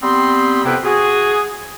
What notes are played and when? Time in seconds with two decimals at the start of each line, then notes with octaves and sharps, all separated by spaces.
0.03 G3 B3 C4 D#4 B5 C6
0.65 F2 C3 B3 E4 B4 G5
0.84 F#4 G#4